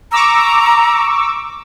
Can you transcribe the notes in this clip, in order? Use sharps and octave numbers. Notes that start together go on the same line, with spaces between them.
A#5 C#6 D6 E6